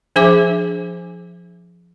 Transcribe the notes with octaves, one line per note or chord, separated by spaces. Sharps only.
F3 D4 G#4 C5 E5 D6